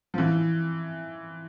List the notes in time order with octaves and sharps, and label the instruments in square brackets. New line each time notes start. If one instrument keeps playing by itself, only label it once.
[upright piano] F3
E3